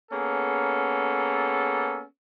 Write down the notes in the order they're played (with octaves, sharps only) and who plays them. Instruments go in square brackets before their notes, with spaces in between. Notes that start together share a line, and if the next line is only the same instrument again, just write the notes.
[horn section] A#3 B3 C#4 G#4 A4